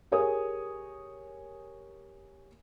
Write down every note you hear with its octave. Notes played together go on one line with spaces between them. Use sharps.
G4 G#4 A#4 C#5 G#5 D#6